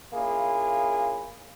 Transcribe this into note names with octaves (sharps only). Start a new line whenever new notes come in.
A#3 C#4 E4 F4 G#4